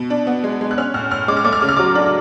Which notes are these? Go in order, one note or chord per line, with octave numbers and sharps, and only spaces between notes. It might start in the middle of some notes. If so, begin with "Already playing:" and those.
Already playing: B2
D4
B3
G#3
G#3
F#6
C#4 F6
A2 F6
A2 F6
G#3 D6
F6
A3 D6
F6
C#3 D6
F6
F#3 D6
D4